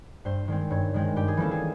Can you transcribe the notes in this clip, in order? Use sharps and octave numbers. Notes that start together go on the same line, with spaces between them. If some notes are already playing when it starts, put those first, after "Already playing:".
G2 C5
D#3 G#3 C4
G2 C#5
D#3 G#3 C4
G2 G4
G#4
E3 G3 A#3 C#4 A4
G#4